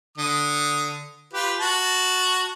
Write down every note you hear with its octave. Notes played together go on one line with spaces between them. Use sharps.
D3 D#6
F4 G4 B4
F#4 A5